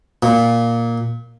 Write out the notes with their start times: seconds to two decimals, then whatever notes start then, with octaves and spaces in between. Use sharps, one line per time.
0.23 A#2